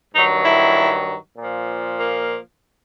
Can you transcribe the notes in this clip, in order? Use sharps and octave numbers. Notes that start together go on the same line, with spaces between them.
G2 D#3 F#3 D#4
E4
A#2 F3
A#3